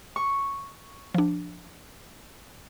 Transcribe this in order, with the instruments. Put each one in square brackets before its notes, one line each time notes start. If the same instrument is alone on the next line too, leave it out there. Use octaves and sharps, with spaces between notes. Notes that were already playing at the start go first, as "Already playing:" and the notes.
[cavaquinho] C#6
[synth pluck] F3 D4